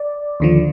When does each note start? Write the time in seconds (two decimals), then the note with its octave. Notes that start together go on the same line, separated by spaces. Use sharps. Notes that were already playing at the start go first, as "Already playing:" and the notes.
Already playing: D5
0.40 D#2 D3 F3